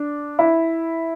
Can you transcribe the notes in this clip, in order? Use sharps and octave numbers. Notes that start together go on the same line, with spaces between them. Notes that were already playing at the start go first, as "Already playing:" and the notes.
Already playing: D4
E4